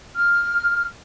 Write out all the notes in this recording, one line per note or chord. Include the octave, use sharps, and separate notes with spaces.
F6